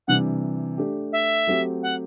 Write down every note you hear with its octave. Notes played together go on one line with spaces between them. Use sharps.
C3 E3 G3 D4 F#5
A3 D4 G4
E5
F#3 A3 C4 G4
F#5